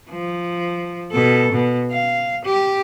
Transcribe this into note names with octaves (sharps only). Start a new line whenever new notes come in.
F3
B2 A4
B2
F5
G4